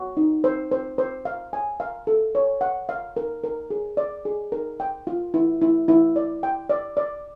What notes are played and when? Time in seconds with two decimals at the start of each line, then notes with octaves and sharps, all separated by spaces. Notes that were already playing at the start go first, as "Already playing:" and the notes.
Already playing: F#4
0.17 D#4
0.44 C5
0.72 C5
0.98 C5
1.25 F5
1.53 G#5
1.80 F5
2.07 A4
2.35 C#5
2.61 F#5
2.89 F5
3.17 A#4
3.44 A#4
3.70 G#4
3.97 D5
4.25 G#4
4.52 A#4
4.80 G5
5.07 F4
5.34 E4
5.61 E4
5.88 E4
6.16 D5
6.43 G5
6.70 D5
6.97 D5